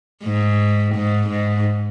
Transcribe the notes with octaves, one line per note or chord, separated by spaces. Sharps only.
G#2
G#2
G#2